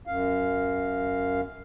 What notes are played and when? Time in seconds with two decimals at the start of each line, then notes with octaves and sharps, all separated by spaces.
0.07 F#2 F5